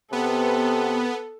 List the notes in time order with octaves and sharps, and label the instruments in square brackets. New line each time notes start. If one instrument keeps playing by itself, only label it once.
[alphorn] C3 [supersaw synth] B3 [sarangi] A4